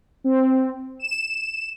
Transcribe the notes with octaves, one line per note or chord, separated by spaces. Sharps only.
C4
E7